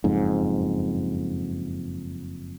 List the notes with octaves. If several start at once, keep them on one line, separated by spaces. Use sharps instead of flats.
F#1 F2 G#2